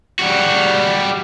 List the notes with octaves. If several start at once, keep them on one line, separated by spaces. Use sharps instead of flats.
G3 F#4